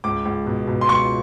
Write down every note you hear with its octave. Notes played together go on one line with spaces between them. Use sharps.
C#2 D6
C#2
B2
B2
C6
C#2 C#6